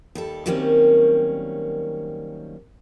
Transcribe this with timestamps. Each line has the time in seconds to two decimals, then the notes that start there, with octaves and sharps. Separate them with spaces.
0.15 D#2 G3 A4
0.46 D#3 F#3 G3 A#3 C4 C#4